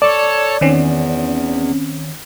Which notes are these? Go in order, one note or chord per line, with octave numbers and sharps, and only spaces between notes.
A4 C#5 D5 A5
E2 D#3 C4 C#4